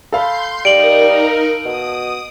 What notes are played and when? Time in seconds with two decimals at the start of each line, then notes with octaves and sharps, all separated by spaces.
0.13 A4 F5 B5 C6 G6
0.65 G3 D#4 A#4 D7 F#7
1.65 B2 D#6